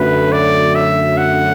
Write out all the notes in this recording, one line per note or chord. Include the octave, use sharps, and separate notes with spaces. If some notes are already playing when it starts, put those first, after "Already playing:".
Already playing: F#2 D3 F#3 A3 B4
D5
E5
F#5